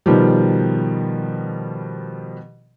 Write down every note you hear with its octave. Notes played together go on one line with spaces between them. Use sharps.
B2 D#3 F3 G3